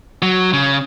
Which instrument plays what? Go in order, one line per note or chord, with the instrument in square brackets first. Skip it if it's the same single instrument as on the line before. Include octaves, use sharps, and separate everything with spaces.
[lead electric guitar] F#3
C#3